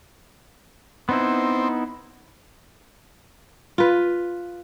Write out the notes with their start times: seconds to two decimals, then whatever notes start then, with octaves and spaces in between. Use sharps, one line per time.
1.09 B3 C4 D#4 E4
3.78 F4 B4